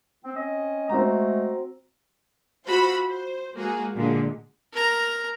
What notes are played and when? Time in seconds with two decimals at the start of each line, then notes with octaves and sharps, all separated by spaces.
0.24 C4
0.35 C4 C#4 D#5
0.89 G#3 A3 C4 F#4 A#5
2.65 F4 F#4 C5 B5 E6
3.08 C5
3.55 G#3 A#3 F#4 G#4
3.96 A#2 D3 G#3
4.72 A#4 A#5